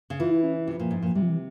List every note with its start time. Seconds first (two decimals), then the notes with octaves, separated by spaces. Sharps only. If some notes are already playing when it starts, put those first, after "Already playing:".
0.10 C#3
0.19 E3 F4
0.31 E4
0.44 C#4
0.67 C3 F3
0.80 A#2
0.91 G#2
1.03 A#2
1.15 C3 G3
1.22 F3
1.30 E3